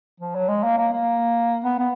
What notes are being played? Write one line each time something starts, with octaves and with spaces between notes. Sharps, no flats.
F3
F#3
G#3
A#3
A#3
A#3
B3
B3